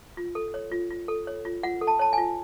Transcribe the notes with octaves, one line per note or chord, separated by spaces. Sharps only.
F4
A4
C#5
F4
F4
A4
C#5
F4
F4 F#5
A4
A5
C#5 A5
F4 G#5